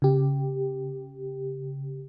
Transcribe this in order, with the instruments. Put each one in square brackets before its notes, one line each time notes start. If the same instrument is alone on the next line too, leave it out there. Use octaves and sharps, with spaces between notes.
[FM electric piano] C#3 G4